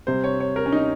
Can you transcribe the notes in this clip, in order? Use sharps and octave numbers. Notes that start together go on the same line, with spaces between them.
C3 G3 C5
C#5
C#5
A#4
C#4
D#4